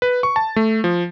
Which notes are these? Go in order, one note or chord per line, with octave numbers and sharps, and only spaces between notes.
B4
C#6
A5
A3
F3